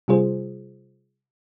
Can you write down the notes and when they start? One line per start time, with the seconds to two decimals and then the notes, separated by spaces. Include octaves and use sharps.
0.08 C3 G3 F4 G#4 C5